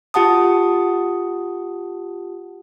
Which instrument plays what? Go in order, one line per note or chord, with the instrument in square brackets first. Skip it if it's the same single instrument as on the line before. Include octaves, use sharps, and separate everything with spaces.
[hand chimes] F4 G4 F#5 A5 D#6